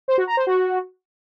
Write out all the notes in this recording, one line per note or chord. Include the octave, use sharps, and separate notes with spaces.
C5
F#4
A#5
C5
F#4